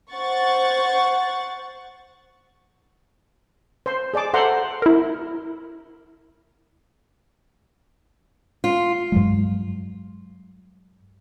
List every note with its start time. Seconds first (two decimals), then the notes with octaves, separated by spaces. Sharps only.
0.13 C5 F#5 C#6 A6
3.86 C5 C6
4.14 G#4 D5 A5 D6
4.34 A4 C5 E5 F#5 A#5 C6
4.82 E4 A#4
8.64 F4
9.12 G2 F#3 G#3